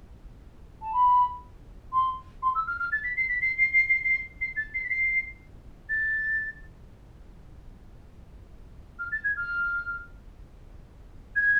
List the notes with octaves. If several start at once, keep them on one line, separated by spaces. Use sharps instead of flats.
A5
B5
C6
C6
E6
F6
F6
A6
B6
C7
B6
C7
C7
C7
C7
C7
C7
A6
C7
B6
C7
A6
F6
A6
G#6
F6
G#6